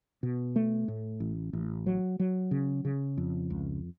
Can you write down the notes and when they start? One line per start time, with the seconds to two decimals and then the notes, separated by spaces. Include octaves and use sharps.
0.23 B2
0.56 A3
0.88 A2
1.20 A1
1.53 A1
1.86 F#3
2.20 F#3
2.51 C#3
2.85 C#3
3.17 F2
3.50 C#2